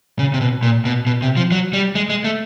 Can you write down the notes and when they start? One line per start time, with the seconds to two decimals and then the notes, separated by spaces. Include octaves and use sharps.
0.19 C#3
0.34 C3
0.41 B2
0.63 A#2
0.85 B2
1.06 B2
1.22 C3
1.37 F3
1.52 F#3
1.73 G3
1.95 G#3
2.10 G#3
2.24 A3